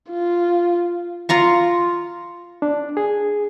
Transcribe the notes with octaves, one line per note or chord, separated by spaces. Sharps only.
F4
F4 A#5 C#6
D4
G#4